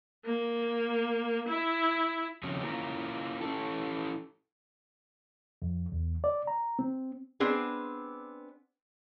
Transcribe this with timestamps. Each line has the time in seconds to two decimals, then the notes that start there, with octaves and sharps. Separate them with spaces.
0.25 A#3
1.48 E4
2.43 C#3 F3 F#3 A3 C4 C#4
2.65 A#3 C#4 E4 F4 A#4
3.41 C#4 E4 A4
5.62 F2
5.92 E2
6.24 D5
6.47 A#5
6.79 C4
7.40 B3 C4 D4 G#4